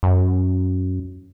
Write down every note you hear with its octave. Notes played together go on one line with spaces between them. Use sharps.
F#2